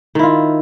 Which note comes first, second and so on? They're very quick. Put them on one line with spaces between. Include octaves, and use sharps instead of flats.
D#3 E4 F4